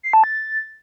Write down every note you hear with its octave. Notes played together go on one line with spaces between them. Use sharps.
C7
A5
A6